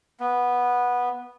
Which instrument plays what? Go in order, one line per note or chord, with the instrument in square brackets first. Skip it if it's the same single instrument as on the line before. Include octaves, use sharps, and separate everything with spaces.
[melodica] B3